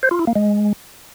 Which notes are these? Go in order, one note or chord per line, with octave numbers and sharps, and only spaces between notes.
C5
F4
E4
A#3
G#3